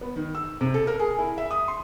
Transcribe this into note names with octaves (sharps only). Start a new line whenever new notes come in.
B3
D#3
E6
C3
A4
A#4
G#4
E4
E5
D#6
C6